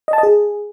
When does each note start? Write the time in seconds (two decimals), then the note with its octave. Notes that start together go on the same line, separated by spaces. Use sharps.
0.08 D#5
0.13 A5
0.18 D#5
0.23 G#4